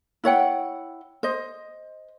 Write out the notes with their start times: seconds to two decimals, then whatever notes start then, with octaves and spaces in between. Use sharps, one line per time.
0.24 E4 C#5 F#5 G5
1.23 C5 D#5